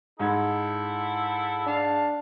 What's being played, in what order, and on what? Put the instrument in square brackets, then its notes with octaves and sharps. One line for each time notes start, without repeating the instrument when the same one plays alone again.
[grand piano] G#2 D#4 G#6 [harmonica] E4 A4
[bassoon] D4 [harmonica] F5 A5